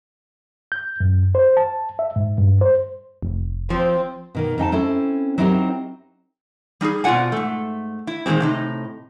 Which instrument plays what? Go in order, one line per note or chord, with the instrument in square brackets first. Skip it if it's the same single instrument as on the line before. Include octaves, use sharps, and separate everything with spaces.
[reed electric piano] G6
F#2
C5
A5
E5
G#2
G2
C5
[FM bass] F1
[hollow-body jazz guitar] F3 [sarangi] C4
[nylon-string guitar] B2 D#3 A#3
F2 D#4 G5 A5
C4 C#4 E4 A4
F#3 C4 D#4 E4 G4 A#4
[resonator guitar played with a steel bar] G3 D#4 F#4 G#4
B2 C4 F4 D5 F#5 G#5
G#2 A3
E4
A#2 D#3 G3 G#3 C4
A2 C3 D#4